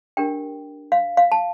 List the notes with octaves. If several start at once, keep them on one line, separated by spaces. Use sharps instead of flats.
D4 G4 A#4 G5
F5
F5
A5